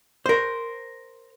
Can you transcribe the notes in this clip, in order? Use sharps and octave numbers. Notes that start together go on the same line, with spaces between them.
A#4 C5